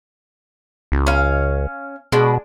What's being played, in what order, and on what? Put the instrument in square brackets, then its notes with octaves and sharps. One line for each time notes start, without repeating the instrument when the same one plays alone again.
[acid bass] C#2
[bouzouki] C#4 F5
[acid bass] B2 [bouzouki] G#3 D4